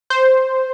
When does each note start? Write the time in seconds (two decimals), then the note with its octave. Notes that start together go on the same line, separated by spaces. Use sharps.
0.10 C5